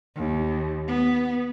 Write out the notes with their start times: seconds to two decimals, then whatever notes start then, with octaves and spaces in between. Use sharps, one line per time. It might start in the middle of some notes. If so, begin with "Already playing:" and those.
0.16 D#2
0.87 B3